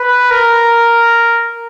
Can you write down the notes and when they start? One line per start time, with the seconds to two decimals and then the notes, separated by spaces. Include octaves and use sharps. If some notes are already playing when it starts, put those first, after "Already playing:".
Already playing: B4
0.31 A#4